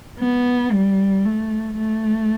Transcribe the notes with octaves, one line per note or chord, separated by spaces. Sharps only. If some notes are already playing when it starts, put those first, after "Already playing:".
B3
G3
A3
A3